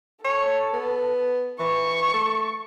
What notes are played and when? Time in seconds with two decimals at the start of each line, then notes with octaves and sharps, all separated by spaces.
0.25 A4 C#5
0.73 B3
1.60 E3 C#6
2.14 A3